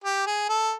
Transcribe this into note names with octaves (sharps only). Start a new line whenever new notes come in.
G4
G#4
A4